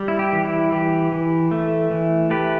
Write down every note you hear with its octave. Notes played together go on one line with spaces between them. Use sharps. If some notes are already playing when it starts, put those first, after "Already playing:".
Already playing: G3
E4
G4
E3
E4
E3 G4
E3
A3
E3
A3 G4 B4